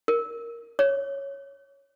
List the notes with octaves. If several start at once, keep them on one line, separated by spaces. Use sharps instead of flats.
A#4
C#5